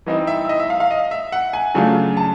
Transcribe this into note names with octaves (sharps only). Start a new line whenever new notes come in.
E3 G3 C4 D#4 D#5
E5
E5
D#5
E5
F5
F5
D#5
E5
F#5
G#5
C#3 F#3 A3 D4 F4
A5